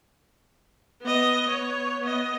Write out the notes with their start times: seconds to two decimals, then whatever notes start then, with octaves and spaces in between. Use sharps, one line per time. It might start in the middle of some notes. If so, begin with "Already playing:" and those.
1.02 B3 D#5
1.49 B3 C#5
2.01 B3 D#5